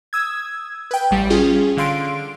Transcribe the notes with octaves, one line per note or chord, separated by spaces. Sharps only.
D#6 E6 G#6
B4 G5
A1 G3
C#4 F4 G#4
D3 F5 C6 D7